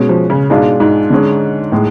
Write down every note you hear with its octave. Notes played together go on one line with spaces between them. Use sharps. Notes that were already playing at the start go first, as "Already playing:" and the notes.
Already playing: B2 G#3 C#4
F3
C#3
G#2 B2 G#3 D4 F4
G#2
D3 G#3 C#4
A2 G#3